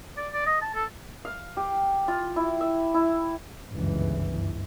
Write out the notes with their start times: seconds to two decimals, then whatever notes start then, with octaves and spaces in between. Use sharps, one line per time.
0.17 D5
0.33 D5
0.46 D#5
0.61 A5
0.75 A4
1.25 F5
1.57 G4
2.08 F4
2.36 E4
2.61 E5
2.94 E4
3.72 G1 C#2 F#2 E3